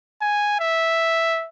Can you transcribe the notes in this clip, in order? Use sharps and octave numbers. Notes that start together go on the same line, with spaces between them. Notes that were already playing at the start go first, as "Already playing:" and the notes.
G#5
E5